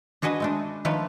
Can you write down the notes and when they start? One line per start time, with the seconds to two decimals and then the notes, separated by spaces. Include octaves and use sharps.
0.22 D4 F#4 G#4 B4 D#5
0.40 G#3 A3 D4
0.85 D#3 F3 A3 B4 C#5 D5